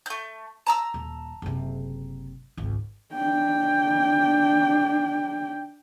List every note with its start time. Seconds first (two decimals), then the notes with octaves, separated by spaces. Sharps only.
0.06 A3 G6
0.67 A5 A#5 E6
0.94 D#1
1.42 F#1 C3
2.57 G#1 C#2
3.14 D4 G5